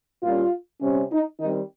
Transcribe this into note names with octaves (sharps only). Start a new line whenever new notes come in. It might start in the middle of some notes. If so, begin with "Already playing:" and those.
A#2 G3 C#4 F4
C3 G3 C#4
D#4
D#3 G3 C4 D#4